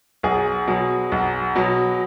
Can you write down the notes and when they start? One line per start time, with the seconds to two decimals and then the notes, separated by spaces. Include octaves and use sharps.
0.23 B1 G#4
0.68 B2 F#3
1.12 B1
1.56 B2 F#3